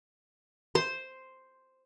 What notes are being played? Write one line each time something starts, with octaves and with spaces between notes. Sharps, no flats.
C5 C6